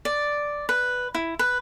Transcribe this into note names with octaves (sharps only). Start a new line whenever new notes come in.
D5
B4
E4
B4